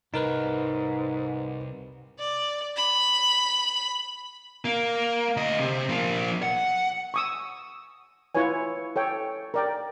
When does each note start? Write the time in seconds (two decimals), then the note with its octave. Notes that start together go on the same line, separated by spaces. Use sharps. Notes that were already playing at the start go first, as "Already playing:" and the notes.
0.14 C2 G#2 D#4 A#4 B4
2.19 D5
2.76 B5
4.65 A#3
5.37 D2 D#5
5.60 C3
5.89 F3 A#3
6.43 F#5
7.14 C#6 D#6 E6
8.35 E4 F4 B4 C#5 G#5
8.96 A4 C#5 G5
9.54 A#4 D5 G5